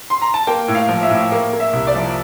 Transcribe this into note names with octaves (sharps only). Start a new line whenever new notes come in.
C6
A#5
A5
A#3 G5
A2
F5
F3
E5
A2
A#3
A#3
E5
C2
D5
F3